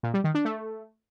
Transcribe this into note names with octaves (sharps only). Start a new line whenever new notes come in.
A#2
G3
D#3
D4
A3